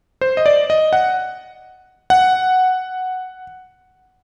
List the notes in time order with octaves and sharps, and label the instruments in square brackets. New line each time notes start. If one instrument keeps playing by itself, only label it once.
[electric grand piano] C5
D#5
D5
D#5
F#5
F#5